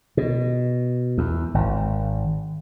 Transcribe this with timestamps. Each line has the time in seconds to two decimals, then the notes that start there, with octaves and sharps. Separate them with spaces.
0.17 B2
1.18 E2
1.54 G#1